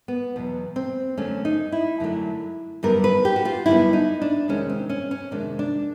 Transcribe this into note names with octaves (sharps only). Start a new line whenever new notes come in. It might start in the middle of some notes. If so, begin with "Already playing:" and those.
B3
E2 B2 F#3
C4
F#2 D3 F#3 A3 C#4
D#4
E4
F#2 D3 F#3 A3
F#2 D3 G3 B3 A#4
B4
G4
F#4
F4
F#2 D3 G3 B3 E4
D#4
D4
F2 C3 D#3 G#3 C#4
C4
C#4
C#4
F2 C3 D#3 G#3 D4
D4